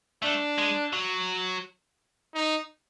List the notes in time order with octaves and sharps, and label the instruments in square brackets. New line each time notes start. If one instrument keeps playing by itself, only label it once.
[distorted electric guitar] A3 [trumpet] D4
[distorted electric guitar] G#3
F#3
[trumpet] D#4